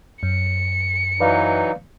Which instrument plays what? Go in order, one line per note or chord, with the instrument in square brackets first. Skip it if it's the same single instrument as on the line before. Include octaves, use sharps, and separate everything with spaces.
[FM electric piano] F#2 [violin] C#7
[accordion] E3 F#3 D#4 [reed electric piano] B4 D5 F5